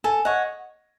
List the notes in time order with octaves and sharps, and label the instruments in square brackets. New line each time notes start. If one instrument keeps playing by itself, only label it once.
[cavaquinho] A4 [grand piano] G#5
[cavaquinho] C#5 F#5 [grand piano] D#5